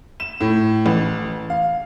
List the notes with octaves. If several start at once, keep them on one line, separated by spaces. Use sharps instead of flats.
E7
A2
A1
F5